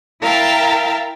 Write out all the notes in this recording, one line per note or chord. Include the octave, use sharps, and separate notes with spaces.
E4 A#4 E5 F5 G5 A5